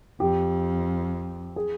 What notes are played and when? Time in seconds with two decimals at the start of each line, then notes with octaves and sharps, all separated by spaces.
0.20 F2 G4
1.56 G#4